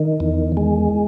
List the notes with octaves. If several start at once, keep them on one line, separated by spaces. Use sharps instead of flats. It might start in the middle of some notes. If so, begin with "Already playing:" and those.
Already playing: D#3
E2
G#3